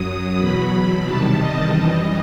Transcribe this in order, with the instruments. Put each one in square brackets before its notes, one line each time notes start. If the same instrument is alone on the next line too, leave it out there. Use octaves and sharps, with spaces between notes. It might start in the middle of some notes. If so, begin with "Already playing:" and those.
Already playing: [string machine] F#2 F#3 D#6
E2 B2 F#3 B5
E2 C3 D#3 G3 A5
D#5
F#2 E3 G3 D#5